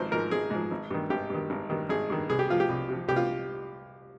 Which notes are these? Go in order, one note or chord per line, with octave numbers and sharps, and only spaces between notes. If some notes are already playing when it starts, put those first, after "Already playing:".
Already playing: G#1 G#2 F3 C5
G#2 F3 A#4
G#1 G#4
G#2 F3
G#1
G2 D#3
G#1 G4
G2 D#3
G#1
G2 D#3
G#1 G#4
G2 D#3
C2 G#4
G4
C3 F3 F4
G4
C2
C3 F3
C2 G4
F4